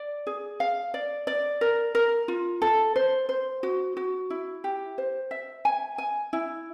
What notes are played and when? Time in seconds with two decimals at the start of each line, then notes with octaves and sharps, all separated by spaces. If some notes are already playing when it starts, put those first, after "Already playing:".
Already playing: D5
0.27 G#4
0.60 F5
0.94 D5
1.27 D5
1.61 A#4
1.95 A#4
2.28 F4
2.62 A4
2.96 C5
3.29 C5
3.63 F#4
3.97 F#4
4.30 E4
4.64 G4
4.98 C5
5.31 E5
5.65 G#5
5.98 G#5
6.33 E4